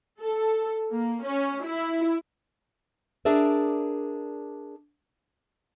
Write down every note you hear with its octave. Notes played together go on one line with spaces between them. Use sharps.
A4
A#3
C#4
E4
D4 G#4 A#4 D5 E5